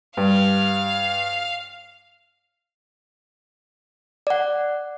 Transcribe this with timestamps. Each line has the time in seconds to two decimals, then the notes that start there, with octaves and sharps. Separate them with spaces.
0.17 G2 F5
4.27 D5 F#5